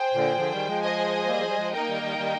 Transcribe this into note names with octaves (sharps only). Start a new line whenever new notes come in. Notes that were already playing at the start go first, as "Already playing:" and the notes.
Already playing: G#4 C5 G5
A#2 D3
D3 F3
D#3 G3
F3 G#3
G#4 C5 D#5 G#5
G3 A#3
F3
G3
F3 G#3
A#3 D#4 A#4 D#5 G5
D#3 G3
D#3 G3
D#3 G3